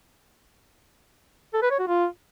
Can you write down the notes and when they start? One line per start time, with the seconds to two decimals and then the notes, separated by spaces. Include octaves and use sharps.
1.54 A4
1.62 B4
1.71 C#5
1.79 F#4
1.88 F4